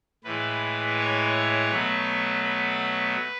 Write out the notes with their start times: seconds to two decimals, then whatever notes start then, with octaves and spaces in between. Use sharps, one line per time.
0.24 A2 E3 G#3 B4
0.98 C#5
1.70 B2 F#3 A3 B4
2.44 B4